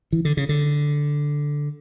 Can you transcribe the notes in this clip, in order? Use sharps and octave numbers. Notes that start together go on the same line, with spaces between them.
E3
D3
C#3
D3